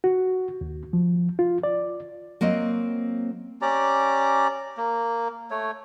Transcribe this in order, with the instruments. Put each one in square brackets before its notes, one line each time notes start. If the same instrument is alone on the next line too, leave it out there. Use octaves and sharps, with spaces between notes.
[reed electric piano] F#4
D#2
F3
F4
D5
[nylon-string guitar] F#3 A#3 C4 C5 D#5
[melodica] C#4 G4 D5 A#5
A#3
A3 C#5